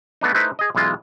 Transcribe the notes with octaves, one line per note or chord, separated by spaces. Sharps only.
A3 B3 D4 D#4
A3 D#4 E4 B4 C5
G#4 D#5
B1 E3 G#3 F4